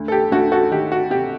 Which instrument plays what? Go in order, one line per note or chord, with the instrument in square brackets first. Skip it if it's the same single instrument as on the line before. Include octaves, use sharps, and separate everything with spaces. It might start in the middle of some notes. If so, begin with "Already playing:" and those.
Already playing: [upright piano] D2
A4
G4
D2 F#4 A4
F#4 A4
D#3 G4
F#4
C3 G4